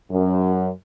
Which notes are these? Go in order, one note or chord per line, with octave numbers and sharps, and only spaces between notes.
F#2